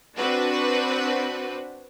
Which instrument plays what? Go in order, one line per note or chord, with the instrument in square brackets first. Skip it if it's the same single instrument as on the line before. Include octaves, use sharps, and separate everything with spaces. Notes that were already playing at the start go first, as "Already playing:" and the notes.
[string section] C4 D4 F#4 B4